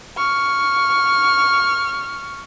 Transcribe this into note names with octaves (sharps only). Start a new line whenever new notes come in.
C#6 F6